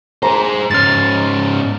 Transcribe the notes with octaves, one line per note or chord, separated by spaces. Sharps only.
G#4 C5 A#5
G#2 C#4 F6 A6